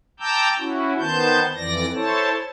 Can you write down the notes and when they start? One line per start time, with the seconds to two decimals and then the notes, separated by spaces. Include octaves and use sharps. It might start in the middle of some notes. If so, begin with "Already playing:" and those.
0.20 G5 A5 A#5 D6 E6 G6
0.59 C#4 E4 F#4
0.99 D#3 B3 C5 A5 G6
1.55 F2 E3 D5 A#6
1.95 E4 A4 C5 C#5 A5